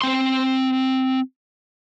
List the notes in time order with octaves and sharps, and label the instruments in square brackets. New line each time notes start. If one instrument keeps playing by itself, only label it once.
[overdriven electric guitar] C4 C6